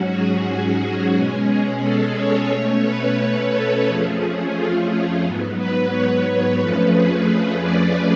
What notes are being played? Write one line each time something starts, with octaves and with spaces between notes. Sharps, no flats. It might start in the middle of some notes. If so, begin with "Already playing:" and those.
Already playing: G#2 F#3 C#4 F#4
G#4
F#4
G#4
B2 G#3 C#4
A4
C#5
B2 A3 C#4
B4
B4
A4
F2 F3 A3 C#4 G#4
F4
F4
G#2 F#3 B3
B4
C#5
F2 F3 A3 C#4 B4
G#4
B4
D5